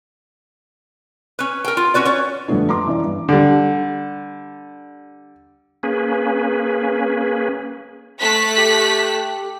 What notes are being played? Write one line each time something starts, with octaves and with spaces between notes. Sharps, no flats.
C#4 B4
A#4 G5
F4
C#4 F#4 B4 D5
C#4 C#5
F2 D3 G3 A3 B3 D4
A#5 C6 D6
E3 C#4 D5
G2
D3 G3
A#3 C#4 G#4 B4
A3 F#6 B6
G4